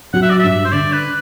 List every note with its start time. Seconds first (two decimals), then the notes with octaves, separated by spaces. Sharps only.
0.13 F#3 F#5
0.22 E5
0.30 D5
0.39 G2 E5
0.65 C5
0.72 D3 D5
0.93 B4